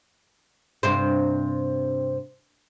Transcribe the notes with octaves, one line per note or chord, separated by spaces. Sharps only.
G2 C3 C5